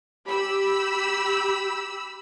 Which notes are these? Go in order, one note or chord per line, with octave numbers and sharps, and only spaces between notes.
G4 B5 E6